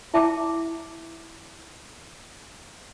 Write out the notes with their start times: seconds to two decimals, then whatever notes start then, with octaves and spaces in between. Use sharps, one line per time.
0.14 E4 E5 G5 A5 A#5 D6